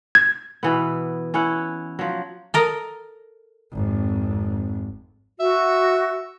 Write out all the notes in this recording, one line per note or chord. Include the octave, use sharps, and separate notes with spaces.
G#6
B2 E3 B3
C#4 E4 F#5
F3 F#3
A4 A#4 D#5
G#1 F2
F#4 E5